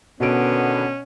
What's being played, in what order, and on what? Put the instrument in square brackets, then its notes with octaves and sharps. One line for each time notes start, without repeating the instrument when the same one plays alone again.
[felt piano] B2 D7 [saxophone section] D3 D#3 B3 [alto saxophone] C#4